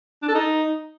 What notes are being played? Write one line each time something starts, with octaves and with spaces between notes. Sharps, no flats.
D4
A4
D#4